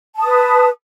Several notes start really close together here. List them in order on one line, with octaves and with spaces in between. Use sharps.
A5 D#6 B4